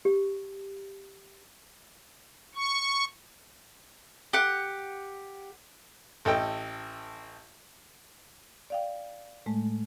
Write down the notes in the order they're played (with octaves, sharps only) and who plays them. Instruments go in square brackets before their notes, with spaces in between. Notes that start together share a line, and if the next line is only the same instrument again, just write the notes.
[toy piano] G4
[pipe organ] C#6
[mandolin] G4 F#5
[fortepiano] A1 A4 D#5 G5
[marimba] D5 F5 G5
A2 G#3 A3